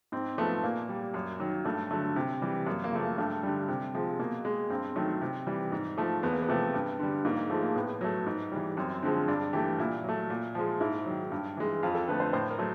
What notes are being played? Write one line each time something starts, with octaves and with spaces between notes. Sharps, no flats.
G#2 C4
F3 A3 B3
A#2 A#3
G3
F#2
D#3 F#3
G2 A3
D3 F#3 A3
C3
E3 G3
F#2 A#3
A#3
C#3 F3 A3
A#3
G2 A3
D3 G3
C3
F3 G#3
B2 A#3
G#3
G2 C4
D#3 F#3 A3
C3
E3 G3
G#2
F3 A3
E2 B3
A#3
B3
C3 F3 A3
G2
D3 G3
G#2 A#3
A#3
F3 G#3 A3
A#3
A2 B3
F#3 A3
G#2
E3 G3
F#2 C4
D3 F3 G#3 C4
G2 D4
E3 A3 G4
A#2 E4
F#3 A3
A#2
F3 G#3
G#2 E4
D#3 F#3
G2
E3 G#3
F2 F4
A4
D3 F3 A3 B4
C5
A2 C5
A#4
F#3 A3